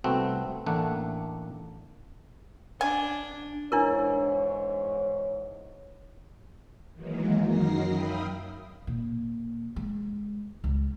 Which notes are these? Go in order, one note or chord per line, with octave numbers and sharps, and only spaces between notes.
C2 A3 B3 C4 F#4
A1 A3 A#3 D4 F#5
D4 G#5
E2 G#2 D4 E4 A#4 C#5
D#3 E3 F#3 G#3 A#3
F#2 F#3 D#4 A#4 A#6 C7
E5 F5 G5 B5 D#6
A#2
G#3
C#2